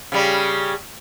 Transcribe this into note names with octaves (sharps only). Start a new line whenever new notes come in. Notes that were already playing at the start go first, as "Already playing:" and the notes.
C#3 G3